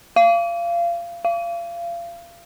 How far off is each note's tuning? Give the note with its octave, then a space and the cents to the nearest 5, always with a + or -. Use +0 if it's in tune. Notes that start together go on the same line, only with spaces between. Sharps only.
F5 -25
F5 -30